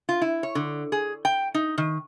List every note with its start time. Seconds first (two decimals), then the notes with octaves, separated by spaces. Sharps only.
0.09 F4
0.22 E4
0.43 C#5
0.55 D3
0.92 G#4
1.25 G5
1.54 D#4
1.78 D#3